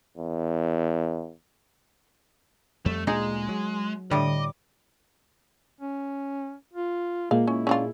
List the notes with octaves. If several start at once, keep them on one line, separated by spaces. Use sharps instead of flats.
E2
F2 G3 A3
D2 A#2 G#3 D#4 G#4
F#3
A2 D3 G3 D#5 D6
C#4
F4
A#2 G#3 A#3 F5
C#4 E4
C#4 D4 F4